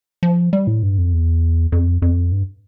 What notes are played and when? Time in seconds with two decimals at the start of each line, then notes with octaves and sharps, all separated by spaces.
0.23 F3
0.53 G3
0.67 A2
0.83 G2
0.98 F2
1.13 E2
1.72 F2
2.02 F2
2.32 G2